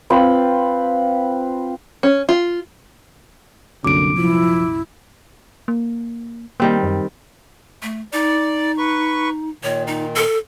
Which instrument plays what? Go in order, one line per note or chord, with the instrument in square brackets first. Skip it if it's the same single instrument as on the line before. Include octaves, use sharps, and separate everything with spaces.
[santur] C4 F4 B4 F5
[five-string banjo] C#4
F4
[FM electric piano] C2 F#2 A#2 [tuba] D3 [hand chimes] D6 D7
[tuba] F3 [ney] E4
[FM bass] A#3
[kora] D#3 G3 C4 [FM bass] A#3
[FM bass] F#2
[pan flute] A3
[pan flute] D#4 [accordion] D5
[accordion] B4 C#6
[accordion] A#2 D#3 [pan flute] C#5
[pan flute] D#4
A4